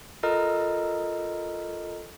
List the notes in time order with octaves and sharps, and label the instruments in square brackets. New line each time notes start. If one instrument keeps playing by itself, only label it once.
[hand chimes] F4 A4 A#4 D#5 A#5 F6